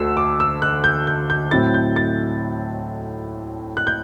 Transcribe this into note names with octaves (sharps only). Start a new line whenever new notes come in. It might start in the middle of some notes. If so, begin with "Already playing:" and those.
Already playing: D2 D3 A3 E6
D6
E6
F#6
G6
G6
G6
A2 F#3 C4 E4 A6
G6
A6
F#6
G6